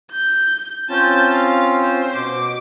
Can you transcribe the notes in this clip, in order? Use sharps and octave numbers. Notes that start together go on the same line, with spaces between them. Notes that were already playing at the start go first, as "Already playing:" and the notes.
G6
C4 C#4 F4 A5 G6
F5
C5
B2 D6